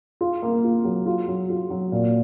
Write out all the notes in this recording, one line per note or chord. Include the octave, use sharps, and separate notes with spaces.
F4
A#3
F4
F#3
F4
F#3
F4
F#3
A#2